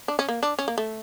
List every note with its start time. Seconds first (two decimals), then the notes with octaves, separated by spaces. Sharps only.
0.08 D4
0.19 C#4
0.28 A#3
0.43 D4
0.59 C#4
0.68 A#3
0.78 A3